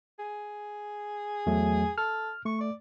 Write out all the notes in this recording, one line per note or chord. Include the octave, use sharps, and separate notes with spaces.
G#4
E2 F#3 A3
A4 F6
A3 C#6
D5